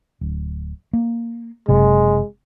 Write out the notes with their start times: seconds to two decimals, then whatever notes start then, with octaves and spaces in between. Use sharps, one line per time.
0.21 D1
0.93 A#3
1.68 F#1 C3 G#3